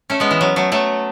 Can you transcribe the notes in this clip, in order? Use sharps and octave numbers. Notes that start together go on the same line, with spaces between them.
A3 C#4
G#3 B3
E3
F#3
F#3 A3
F#3 A3